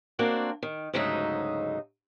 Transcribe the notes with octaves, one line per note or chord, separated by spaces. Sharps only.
A#3 C4 D4 F#4
D#3
D2 G#2 C#3 F#3 D#4 E5